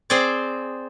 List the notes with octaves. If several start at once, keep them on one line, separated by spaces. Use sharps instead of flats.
C4 G#4 C5 D5